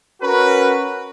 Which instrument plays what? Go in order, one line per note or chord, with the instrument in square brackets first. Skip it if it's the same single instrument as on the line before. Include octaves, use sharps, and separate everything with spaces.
[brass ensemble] C#4 F#4 A#4 B4